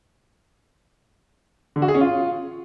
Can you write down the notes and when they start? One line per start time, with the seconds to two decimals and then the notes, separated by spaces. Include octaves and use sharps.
1.76 D3
1.82 F#4
1.88 G#4
1.95 C#4
2.01 F4